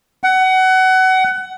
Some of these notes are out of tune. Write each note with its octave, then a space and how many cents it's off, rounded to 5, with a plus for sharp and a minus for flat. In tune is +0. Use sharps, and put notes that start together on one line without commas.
F#5 +25